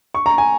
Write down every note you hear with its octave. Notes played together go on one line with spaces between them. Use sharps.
C#6
A#5
G#5